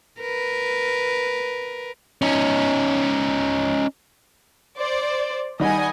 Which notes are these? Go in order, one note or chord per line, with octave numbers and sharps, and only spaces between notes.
A#4 B4
C#4 D#4
C5 D5
D#3 G3 D#5 F#5 G#5